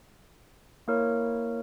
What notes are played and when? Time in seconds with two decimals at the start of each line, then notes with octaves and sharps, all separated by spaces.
0.88 A#3 E4 A#4 C#5